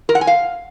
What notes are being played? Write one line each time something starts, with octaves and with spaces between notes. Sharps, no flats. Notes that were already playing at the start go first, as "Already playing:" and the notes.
A#4
F#5
G#5
F5